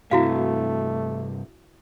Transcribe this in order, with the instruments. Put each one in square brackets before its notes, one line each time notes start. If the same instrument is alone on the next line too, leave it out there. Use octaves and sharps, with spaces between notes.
[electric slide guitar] G2 C3 [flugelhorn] A3 [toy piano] E4 F#4 F5